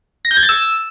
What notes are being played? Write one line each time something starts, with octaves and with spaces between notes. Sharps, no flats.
A#6
G6
G#6
A6
E6